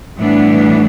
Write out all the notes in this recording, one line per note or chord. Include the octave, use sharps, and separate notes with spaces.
A2 E3 G3 B3 D4